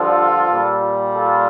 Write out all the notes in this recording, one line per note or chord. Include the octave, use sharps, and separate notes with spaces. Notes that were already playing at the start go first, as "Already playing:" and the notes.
Already playing: G2 D3 F3 F4 A4
A#2 G3
F4 A4